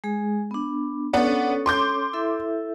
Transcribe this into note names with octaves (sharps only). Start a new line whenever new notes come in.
G#3 G#4
B3 D4
B3 C#4 D4 A4 C#5
C6 D6 G6
E4 A4 E5